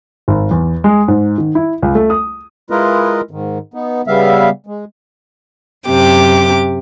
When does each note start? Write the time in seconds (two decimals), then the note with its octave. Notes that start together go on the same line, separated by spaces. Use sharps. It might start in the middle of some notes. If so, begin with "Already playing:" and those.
0.28 G#1
0.51 E2
0.84 G#3
1.08 G#2
1.38 D#3
1.55 E4
1.82 C#2
1.95 A3
2.10 D#6
2.70 G#3 E4 F4 A#4 B4 D#5
3.31 G#2 D#3
3.74 B3 D#4
4.07 C#3 G3 B3 E5 F5
4.66 G#3
5.88 F#2 C3 G4 D6